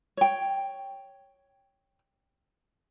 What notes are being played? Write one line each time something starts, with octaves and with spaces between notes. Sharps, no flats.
C#5 G5